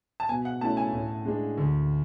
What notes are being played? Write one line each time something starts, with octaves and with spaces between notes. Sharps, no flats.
A5
B2 G#5
F#5
A3 C#4 E4 A5
G#5
A2
G#3 D4
D2